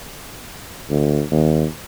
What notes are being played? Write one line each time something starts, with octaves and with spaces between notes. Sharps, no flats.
D2
D#2